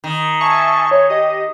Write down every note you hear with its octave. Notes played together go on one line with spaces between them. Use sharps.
D#3
E5 G#5 A5 C#6
C#5
G4 D#5